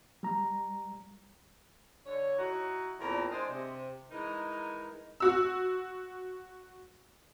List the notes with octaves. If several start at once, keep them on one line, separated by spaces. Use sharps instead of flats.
G3 A#5
D3 C#5
D#4 E4 F#4
E2 A#2 C4 A4 A#4
G#3 D4 C5 D5 D#5
C3
E3 G#3 D#4 A#4
F#4 E6